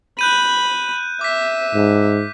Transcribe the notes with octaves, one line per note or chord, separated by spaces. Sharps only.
B5 F#6 G6 D#7
E5 D6 B6
G#2